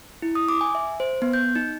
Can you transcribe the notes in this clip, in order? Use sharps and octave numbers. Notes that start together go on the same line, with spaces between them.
E4
D#6
D6
G#5
E5
C5
B3
G6
D#4